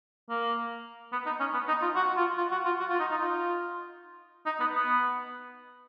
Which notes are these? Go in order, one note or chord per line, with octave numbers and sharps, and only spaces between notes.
A#3
B3
D#4
C#4
B3
D#4
F4
F#4
F4
F4
F#4
F4
F#4
F4
D#4
D#4
F4
D#4
B3
B3